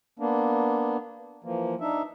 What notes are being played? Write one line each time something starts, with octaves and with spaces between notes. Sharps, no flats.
A#3 B3 D4
E3 F3 A#3
D4 D#4 E5